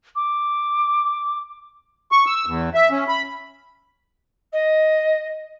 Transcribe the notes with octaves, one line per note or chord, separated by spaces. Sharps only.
D6
C#6
E6
E2
E5
C#4
B5
D#5